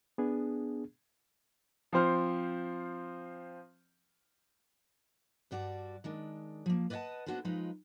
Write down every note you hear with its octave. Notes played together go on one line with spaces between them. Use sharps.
B3 D4 G#4
F3 C4 C5 F6
G2 G3 F#4 D5 A5
D#3 G#3 D4
F3 A#3
B4 D5 D#5 F5 F#5 A5
B3 D4 F#4 A4 B4 C5
F3 G#3 D#4 F4 B4